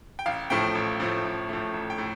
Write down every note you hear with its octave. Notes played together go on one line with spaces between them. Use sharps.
G5
A1 F5
A2 F3 A3 G5
A1
A2 F3 A3
A1
A2 F3 A3
A1
G5
A2